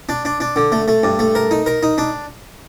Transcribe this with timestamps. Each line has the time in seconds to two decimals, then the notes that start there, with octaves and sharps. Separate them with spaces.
0.09 D4
0.25 D4
0.40 D4
0.56 D3
0.72 A3
0.88 A3
1.03 G2
1.19 A3
1.35 A#4
1.51 D#4
1.66 A#4
1.83 D#4
1.98 D4